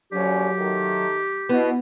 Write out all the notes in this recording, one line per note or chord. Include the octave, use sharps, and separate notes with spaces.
A#1 D3 F#3 C#4 G4
D#3 A3
B2 B3 E4